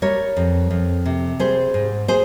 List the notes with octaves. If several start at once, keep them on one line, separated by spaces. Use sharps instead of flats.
G3 A#4 C#5
F2
F2
C3
G3 G#4 C5
G#2
G#4 C5